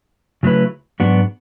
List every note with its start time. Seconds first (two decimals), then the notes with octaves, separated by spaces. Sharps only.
0.43 C#3 F#3 A3 E4 B4
1.00 G#2 F#3 B3 D4 F#4